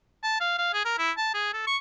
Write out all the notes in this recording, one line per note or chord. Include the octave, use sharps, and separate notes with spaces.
A5
F5
F5
G#4
A#4
E4
A5
G#4
A4
C#6